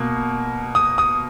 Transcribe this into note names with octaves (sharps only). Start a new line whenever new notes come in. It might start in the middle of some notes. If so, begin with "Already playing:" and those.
Already playing: B2 A#3
D#6
D#6